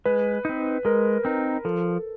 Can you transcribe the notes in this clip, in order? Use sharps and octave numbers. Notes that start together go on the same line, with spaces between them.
G#3 B4
C4 D#4
G#3 A#4
C4 D#4
F3 A4